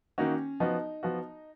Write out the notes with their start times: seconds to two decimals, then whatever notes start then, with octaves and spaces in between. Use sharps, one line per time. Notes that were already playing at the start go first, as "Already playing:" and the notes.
0.18 D#3 A#3 C#4 D#4 F#4
0.60 F3 B3 D#4 F#4
1.03 F3 B3 F#4